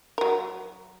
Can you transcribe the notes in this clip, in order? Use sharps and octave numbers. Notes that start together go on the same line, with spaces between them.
F#3 A#4